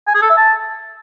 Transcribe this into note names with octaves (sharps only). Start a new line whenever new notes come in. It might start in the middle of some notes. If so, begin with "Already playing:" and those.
G#5
G#4
A4
E5
A5